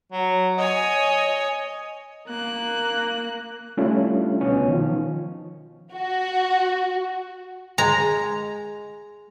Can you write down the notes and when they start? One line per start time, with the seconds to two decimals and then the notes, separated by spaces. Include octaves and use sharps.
0.12 F#3
0.58 C#5 D#5 G#5
2.28 A#3 F#6
3.77 G3 A3 C#4 D4 E4 F4
4.41 C#2 B2 B3 C#4
4.68 D#3 F3
5.93 F#4
7.78 G#3 A#5